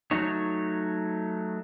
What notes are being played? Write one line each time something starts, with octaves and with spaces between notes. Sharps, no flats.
F#3 A3 D#4 C#5